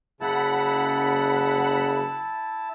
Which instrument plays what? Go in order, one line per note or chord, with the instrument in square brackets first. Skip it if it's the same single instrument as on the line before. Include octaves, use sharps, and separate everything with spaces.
[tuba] F#1 [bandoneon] C#3 [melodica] E4 A5 [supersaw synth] F#5 B5